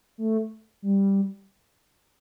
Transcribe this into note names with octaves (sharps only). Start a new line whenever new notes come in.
A3
G3